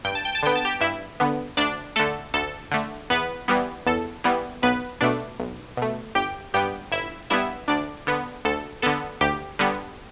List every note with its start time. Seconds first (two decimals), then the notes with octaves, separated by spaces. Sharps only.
0.04 G2 G5
0.15 A5
0.25 G5
0.35 A5
0.43 D3 B3 G5
0.55 A5
0.65 G4 G5
0.81 G2 E4 E5
1.20 D3 B3
1.57 D2 D4 D5
1.96 D3 A3 A4
2.33 D2 A4
2.71 D3 A3
3.10 E2 B3 B4
3.48 E3 G3 B3
3.86 E2 A4
4.24 E3 G3 B3
4.63 B1 B3 B4
5.01 B2 A3 D4 D5
5.39 B1
5.77 B2 A3
6.15 G1 G4 G5
6.54 G2 G3 B3 G4 G5
6.92 G1 E4 E5
7.30 G2 G3 B3 E4 E5
7.68 D2 D4 D5
8.07 D3 B3
8.45 D2 A4
8.82 D3 B3 A4
9.21 D2 G4
9.59 D3 G3 B3